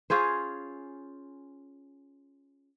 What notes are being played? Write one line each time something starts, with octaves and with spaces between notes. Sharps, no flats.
C#4 F4 G#4 C5